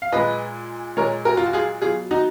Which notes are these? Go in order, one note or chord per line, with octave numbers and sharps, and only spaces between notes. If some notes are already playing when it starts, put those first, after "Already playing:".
F5
A#2 G#3 B4 D#5
A#2 G#3 A#4 C#5
F#4 A#4
F4
F#4
F4 G#4
B2 F#3 F4 G#4
D#4 F#4